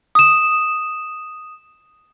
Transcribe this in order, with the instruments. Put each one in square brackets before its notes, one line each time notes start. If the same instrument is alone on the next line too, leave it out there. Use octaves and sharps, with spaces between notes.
[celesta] D#6 E7